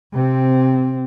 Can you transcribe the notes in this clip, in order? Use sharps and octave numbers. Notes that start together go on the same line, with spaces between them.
C3 C4